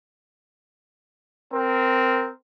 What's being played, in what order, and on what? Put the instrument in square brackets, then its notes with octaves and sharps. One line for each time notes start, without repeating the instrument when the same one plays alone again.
[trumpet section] C4 A#4